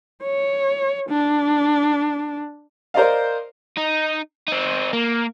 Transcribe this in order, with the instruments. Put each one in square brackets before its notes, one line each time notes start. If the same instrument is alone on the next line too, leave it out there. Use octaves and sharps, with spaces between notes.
[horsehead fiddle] C#5
D4
[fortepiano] A#4 C5 D5 D#5 F5
[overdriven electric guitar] D#4
C4 D#4
A#3